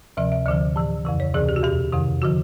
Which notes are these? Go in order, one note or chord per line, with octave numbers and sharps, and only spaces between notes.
D2 C3 F3 E5
E5
D2 D3 F3 D#5
A2 E3
F2 C#3 E3
C#5
D2 C3 E3 G#4
G4
F#4
E2 B2 G4
F2 C3 D#3
D3 F3 F#4